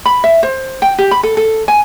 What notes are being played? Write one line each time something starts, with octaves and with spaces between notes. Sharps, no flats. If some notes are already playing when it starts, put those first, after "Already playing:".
B5
E5
C5
G5
G4
B5
A4
A4
G#5